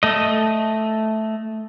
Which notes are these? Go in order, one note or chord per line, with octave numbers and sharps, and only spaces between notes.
A3 D#5